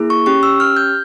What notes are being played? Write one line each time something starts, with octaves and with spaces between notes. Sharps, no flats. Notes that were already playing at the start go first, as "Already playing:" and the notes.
Already playing: A#3 E4 G#4
C#6
C#4 G4 C#6
E6
F6
G6